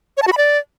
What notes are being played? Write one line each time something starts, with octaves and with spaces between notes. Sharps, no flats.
C#5
A5
F#4
B5
D5